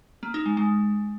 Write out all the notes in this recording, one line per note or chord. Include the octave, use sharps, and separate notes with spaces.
A#3
D#4
G#3
G#3